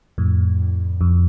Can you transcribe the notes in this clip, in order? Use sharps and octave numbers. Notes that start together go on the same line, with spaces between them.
F2 A2
F2